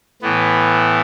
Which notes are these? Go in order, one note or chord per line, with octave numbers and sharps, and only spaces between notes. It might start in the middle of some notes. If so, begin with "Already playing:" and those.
A2 E3 B3